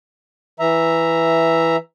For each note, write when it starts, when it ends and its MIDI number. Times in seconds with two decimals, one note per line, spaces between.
0.60 1.76 52
0.60 1.76 76
0.60 1.76 82